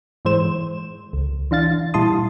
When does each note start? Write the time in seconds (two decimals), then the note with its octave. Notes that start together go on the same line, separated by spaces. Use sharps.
0.25 G#2 E3 G#3 C5 E7
1.13 C#2
1.51 E3 D4 F5 A6
1.94 A#2 G3 E4 A5 C6 D#6